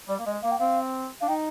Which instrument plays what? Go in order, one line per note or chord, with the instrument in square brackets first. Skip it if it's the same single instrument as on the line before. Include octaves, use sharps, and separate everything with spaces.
[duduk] G3 [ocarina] D5
[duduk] A#3
[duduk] G#3 [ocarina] D#5
[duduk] A#3 [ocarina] F5
[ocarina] G5
[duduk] C4 [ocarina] F5
[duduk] D4 [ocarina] F5
[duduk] D#4 [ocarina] G5